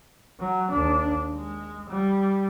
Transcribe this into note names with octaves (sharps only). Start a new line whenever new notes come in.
F#3
D#2 D4
G#3
G3